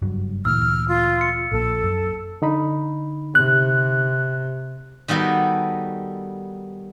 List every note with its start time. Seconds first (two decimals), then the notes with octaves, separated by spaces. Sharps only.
0.02 F#1 G2 F#3
0.45 D2 A#2 E3 E6 F6
0.88 F4
1.21 C#7
1.52 A#1 A#2 A4
1.83 F#2
2.42 D3 D#4 B5
3.35 C3 F#6
5.08 D#3 G3 B3 F#4 A4